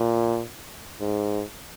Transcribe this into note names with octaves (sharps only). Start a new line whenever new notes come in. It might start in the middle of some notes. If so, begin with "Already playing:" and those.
Already playing: A#2
G#2